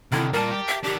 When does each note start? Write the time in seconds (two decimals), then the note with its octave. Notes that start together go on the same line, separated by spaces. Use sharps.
0.12 C2 D3 D#3 E4
0.33 A#2 G3 A#4 A5
0.51 G4
0.68 E5
0.83 D#3 D4 G4